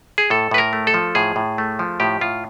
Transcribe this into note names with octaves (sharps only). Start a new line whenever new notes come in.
G#4
A2 A4
A2 B4
A#4
A3
A4
F3
A2 G#4
A2
A3
F3
A2 G4
A2 F4